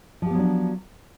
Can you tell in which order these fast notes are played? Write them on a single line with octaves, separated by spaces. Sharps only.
F3 G4 B3 F#3 D4